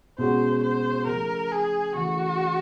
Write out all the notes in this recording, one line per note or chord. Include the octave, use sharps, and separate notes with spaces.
B2 G#3 C#4 F#4 C5
C5
C#3 F3 A3 A#4
G#4
C#3 E3 A3 F#4